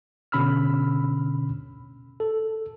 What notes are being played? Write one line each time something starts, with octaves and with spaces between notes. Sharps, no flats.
B2 D3 C#4 B5 E6 F6
A4